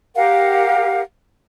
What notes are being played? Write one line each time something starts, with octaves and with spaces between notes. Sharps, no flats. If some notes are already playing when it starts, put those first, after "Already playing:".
G4 A#4 F5 F#5